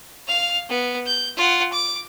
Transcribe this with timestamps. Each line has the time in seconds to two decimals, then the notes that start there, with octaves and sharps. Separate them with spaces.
0.28 F5 F7
0.69 B3
1.06 G6
1.37 F4 F#5
1.72 D6